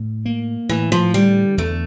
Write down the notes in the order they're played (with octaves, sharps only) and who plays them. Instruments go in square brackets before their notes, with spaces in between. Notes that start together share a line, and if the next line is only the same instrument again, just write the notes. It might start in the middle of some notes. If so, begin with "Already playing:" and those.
Already playing: [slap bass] A2
A#3
[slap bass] A2 [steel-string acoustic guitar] E3
[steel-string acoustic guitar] F3
[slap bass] D3 [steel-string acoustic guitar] G3
[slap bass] E2 [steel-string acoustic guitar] A3